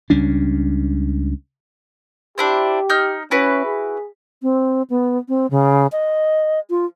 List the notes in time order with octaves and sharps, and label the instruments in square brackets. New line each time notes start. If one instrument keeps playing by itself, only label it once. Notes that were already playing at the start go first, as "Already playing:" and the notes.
[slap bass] C#2 G3 C#4 D4
[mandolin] D4 E4 C5 [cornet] G4
[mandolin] D#4 F6 G6
[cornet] C#4 [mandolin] E4 F#4 B4
[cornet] G#4
[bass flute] C4
B3
C4
C#3
D#5
F4